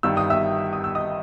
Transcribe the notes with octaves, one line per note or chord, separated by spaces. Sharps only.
G1 G2 D#3 G3 E6
D#6
E5 E6
D#6
E6
D#5 D#6